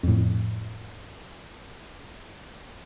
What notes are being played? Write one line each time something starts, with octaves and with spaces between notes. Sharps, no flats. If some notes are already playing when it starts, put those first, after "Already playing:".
F2 A2